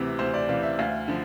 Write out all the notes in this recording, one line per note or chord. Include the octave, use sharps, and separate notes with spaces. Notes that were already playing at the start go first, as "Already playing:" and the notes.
Already playing: D2 C3 E3
D2 C5
D5
C3 E3 F5
E5
D2 F5
D3 F3